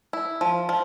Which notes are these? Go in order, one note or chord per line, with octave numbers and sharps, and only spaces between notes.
E4
F3
F3